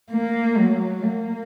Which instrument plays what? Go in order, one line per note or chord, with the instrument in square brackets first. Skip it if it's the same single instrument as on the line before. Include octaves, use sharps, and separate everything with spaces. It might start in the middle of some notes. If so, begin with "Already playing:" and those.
[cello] A#3
F#3
A#3